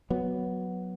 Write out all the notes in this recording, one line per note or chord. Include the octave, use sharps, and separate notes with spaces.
F#3 B3